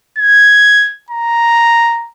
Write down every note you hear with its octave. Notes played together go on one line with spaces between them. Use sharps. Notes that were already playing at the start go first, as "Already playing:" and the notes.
G#6
A#5